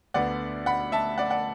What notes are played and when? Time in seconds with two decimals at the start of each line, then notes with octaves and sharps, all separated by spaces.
0.14 D2 D3 B3 D5 F#5
0.66 F#5 B5
0.92 E5 A5
1.18 D5 F#5
1.30 D5 F#5